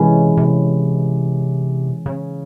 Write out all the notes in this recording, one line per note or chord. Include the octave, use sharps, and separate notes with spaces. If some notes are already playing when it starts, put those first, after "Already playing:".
Already playing: C3 E3 G#3 C#4 E4
C3
C#3